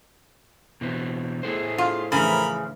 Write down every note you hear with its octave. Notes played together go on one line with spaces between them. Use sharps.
B2 E3 C4
A2 E4 G#4 A4 C5
F4
A2 C#3 E3 F3 A#4 B5